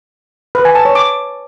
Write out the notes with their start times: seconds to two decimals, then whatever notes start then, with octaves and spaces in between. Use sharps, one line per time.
0.55 B4
0.65 G#5
0.75 A5
0.85 C#5
0.95 D6